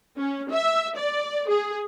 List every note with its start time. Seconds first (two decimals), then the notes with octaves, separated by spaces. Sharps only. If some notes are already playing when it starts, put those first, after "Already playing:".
0.19 C#4
0.52 E5
0.97 D5
1.49 G#4